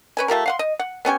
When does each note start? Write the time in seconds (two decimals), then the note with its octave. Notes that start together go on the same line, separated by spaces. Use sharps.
0.17 C#4 B4 G#5
0.28 A3 F4 G4 A#4
0.46 F5 F#5 C6
0.59 D#5
0.79 F#5
1.05 B3 C#4 G4 G#5